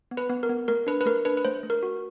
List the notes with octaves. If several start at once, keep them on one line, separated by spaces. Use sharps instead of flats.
B3
B4
B3
A#4
B3
A3 A#4
D4 B4
B4
A3 A#4
D4 B4
B4
A3 C5
A3
A#4
F#4